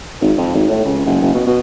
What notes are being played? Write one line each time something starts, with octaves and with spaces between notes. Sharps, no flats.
G#1
F2
G#1
A2
C#2
F#1
F#1
B2
B2